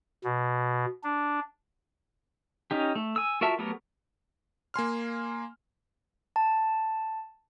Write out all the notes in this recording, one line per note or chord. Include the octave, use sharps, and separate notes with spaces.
B2
D4
C#4 D#4 G4
A3
G#5 E6
F4 F#4 A#4 E5 A5
F#3 A3 B3 G4 A#4
A#3 G#5 C6 F6
A5